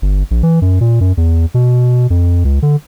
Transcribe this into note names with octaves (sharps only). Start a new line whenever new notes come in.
G1
A#1
E3
F#2
A#2
F#2
E2
B2
F2
C#2
D3